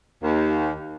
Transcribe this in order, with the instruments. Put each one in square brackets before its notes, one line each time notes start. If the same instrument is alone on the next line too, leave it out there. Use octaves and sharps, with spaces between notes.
[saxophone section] D#2